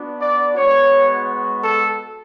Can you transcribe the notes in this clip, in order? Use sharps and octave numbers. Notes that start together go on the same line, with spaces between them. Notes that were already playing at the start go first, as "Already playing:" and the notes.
Already playing: B3 D4 F#4
D5
G#3 B3 F#4 C#5
A4